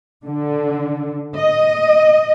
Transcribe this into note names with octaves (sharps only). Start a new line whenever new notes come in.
D3
D#5